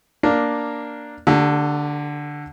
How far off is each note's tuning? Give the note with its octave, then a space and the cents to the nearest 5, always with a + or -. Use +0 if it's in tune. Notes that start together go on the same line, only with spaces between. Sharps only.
A#3 +0 D4 +0 A#4 +0
D3 +0 A3 +40 G4 +0